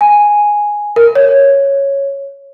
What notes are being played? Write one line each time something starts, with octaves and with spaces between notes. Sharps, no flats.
G#5
A#4
C#5